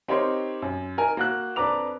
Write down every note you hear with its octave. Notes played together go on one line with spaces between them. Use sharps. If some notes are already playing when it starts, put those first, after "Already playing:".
C4 D#4 G4 A#4 C#5 C6
F#2
D#4 A#4 G#5
A#3 F#4 F#6
F2 D4 B4 A#5 D6 F7